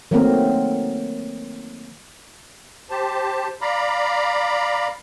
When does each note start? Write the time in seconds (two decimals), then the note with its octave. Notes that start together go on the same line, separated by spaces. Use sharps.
0.11 D#3 F#3 A3 A#3 C4 A#4
2.90 G4 C5 A5
3.61 D5 F5 A#5 B5